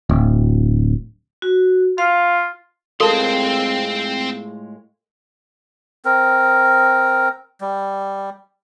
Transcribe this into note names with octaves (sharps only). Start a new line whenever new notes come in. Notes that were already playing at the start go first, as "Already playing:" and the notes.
D1
F#4
F4 F5
A2 G#3 C4 F4 A4 A#4 A5 C6
C4 A#4
G3